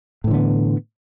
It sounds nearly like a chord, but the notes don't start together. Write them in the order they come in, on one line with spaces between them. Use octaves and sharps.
A2 E3 D3 B3